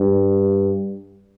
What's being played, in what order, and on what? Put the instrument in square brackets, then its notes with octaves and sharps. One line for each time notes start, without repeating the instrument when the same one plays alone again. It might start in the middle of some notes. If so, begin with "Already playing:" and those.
Already playing: [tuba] G2